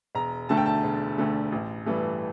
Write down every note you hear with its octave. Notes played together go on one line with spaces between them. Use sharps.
E1 A#5
D2 D3 A3 A5
G5
A5
E1
D2 D3 A3
A1
G2 E3 A3